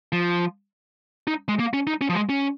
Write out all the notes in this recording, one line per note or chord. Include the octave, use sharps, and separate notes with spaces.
F3
D#4
G#3
A#3
C#4
D#4
C#4
F3
G#3
C#4